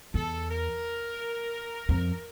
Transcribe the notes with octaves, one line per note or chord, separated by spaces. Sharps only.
E2 A4
A#4
F2